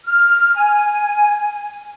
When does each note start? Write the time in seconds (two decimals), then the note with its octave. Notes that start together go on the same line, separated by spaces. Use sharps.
0.05 F6
0.56 G#5